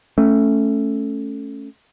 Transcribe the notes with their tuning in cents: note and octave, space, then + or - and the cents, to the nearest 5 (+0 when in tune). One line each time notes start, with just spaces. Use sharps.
A3 +0 C#4 +0